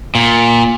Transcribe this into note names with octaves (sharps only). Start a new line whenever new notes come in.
A#2